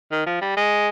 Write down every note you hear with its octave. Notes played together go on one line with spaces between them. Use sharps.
D#3
F3
G3
G#3